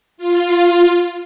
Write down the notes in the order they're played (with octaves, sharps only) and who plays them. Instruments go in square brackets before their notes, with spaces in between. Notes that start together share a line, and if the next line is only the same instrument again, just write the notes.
[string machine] F4